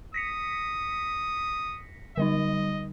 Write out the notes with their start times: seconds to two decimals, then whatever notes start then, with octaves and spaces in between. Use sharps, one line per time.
0.14 D#6 A#6 B6 C#7
2.17 D3 G3 D#4 D#5